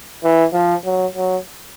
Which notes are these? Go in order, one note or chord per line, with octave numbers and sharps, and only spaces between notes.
E3
F3
F#3
F#3